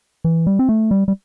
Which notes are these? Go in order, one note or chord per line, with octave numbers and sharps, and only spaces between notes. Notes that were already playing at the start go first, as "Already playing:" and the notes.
E3
G3
C4
A3
G3
G3